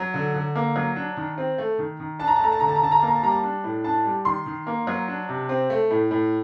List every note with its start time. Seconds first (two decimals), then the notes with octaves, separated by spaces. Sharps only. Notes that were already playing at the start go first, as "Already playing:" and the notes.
Already playing: F#3
0.14 D3
0.34 D3
0.55 A#3
0.76 F#3
0.96 D4
1.17 D#3
1.38 C4
1.58 A3
1.78 D#3
2.00 D#3
2.20 D4 A5
2.27 A#5
2.36 A5
2.40 A3 A#5
2.52 A5
2.60 D3 A#5
2.68 A5
2.75 A#5
2.82 D3 A5
2.92 A#5
2.99 A#3 A5
3.07 A#5
3.15 A5
3.23 G3 A#5
3.31 A5
3.43 D4
3.64 A2
3.84 D4 A5
4.05 G3
4.25 D#3 C6
4.46 D#3
4.67 A#3
4.87 F#3
5.08 D4
5.29 C3
5.49 C4
5.70 A3
5.90 A2
6.11 A2